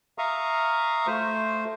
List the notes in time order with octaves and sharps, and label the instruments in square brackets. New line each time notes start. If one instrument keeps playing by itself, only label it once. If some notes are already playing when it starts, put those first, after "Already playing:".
[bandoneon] E5 F5 A#5 C#6 D#6
A3 C5